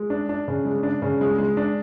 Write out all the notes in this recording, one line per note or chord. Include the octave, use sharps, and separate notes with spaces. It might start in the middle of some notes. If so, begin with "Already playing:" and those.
Already playing: G#3
D4
D4
C#3
G#3
D4
C#3
G#3
G#3
D4